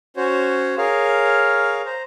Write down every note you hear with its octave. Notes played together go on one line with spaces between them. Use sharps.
C#4 F#4 C5 C#5
G#4 A#4 C#5 F5
C5 A#5